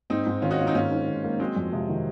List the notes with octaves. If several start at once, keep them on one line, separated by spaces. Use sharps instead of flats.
G#2 C4 D#4
G#2
D#3 C#4 F4
D#4 F#4
A#3 C#4 F4
C4 D#4
G#2 C#4 F4
G#2
D#3
A#3
F#3 G#3 C4
F2
C3 F3 G#3
D#3